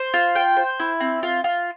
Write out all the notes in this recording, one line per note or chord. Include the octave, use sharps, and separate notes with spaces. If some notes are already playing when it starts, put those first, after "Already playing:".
Already playing: C5
F4
G5
C5
E4
C4
F4
F4